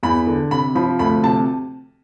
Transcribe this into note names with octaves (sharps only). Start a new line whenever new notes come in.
E2 B5
D3
C3 B5
F3 B5
D2 B5
C3 A5